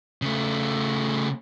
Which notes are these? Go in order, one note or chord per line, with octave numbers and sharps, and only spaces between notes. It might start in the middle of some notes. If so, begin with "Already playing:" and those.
C#3 A3